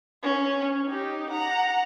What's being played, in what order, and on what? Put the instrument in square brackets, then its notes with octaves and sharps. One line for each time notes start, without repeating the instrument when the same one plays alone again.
[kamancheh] C#4
D#4 G4
F#5 A#5